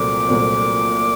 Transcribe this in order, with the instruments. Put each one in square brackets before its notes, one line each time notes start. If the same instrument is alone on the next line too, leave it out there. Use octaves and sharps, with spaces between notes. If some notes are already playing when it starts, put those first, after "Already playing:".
Already playing: [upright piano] C2 A#2 F#3 A3 C4 [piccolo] D6
[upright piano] C2 A#2 F#3 A3 C4